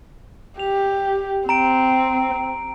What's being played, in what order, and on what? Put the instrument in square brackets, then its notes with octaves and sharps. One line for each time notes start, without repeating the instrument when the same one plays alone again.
[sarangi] G4 [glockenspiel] F7
[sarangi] C4 [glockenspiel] A#5 D7